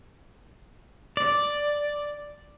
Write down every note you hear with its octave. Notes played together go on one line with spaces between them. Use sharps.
D5